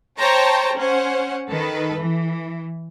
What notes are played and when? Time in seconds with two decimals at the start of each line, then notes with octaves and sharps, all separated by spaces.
0.18 C5 C#5 G5 A5 A#5
0.76 C#4 C5 F#5
1.50 D#3 A4 B4
1.99 E3